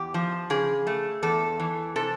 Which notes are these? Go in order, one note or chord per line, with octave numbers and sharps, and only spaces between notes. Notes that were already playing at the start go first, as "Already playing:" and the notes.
Already playing: E2 G4
F3
C#3 G#4
A3
E2 A4
E3
C3 A4